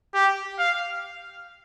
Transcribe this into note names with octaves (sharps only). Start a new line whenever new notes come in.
G4
F5